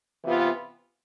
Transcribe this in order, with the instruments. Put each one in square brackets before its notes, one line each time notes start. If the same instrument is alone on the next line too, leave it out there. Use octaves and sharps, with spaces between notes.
[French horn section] C3 E3 B3 F4